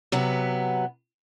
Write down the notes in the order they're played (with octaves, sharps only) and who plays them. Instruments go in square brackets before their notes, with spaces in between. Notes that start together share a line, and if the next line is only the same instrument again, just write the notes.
[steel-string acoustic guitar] C3 F#3 B3 B4